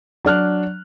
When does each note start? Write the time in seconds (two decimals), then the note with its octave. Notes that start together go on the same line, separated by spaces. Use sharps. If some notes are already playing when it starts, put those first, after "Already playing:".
0.25 F#3 D4 F6 F#6